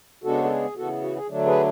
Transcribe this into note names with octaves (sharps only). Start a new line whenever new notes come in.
C#3 G#3 B3 D4 F#4 A4
A4
G#4
C#3 E3 B3 F#4 A4
F#4
G#4
D3 F#3 A3 D4
G#4 B4